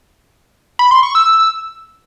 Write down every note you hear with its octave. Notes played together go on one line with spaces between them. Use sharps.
B5
C6
C#6
E6